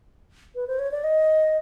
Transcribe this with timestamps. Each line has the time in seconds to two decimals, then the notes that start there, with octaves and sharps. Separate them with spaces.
0.55 B4
0.68 C5
0.79 C#5
0.92 D5
1.04 D#5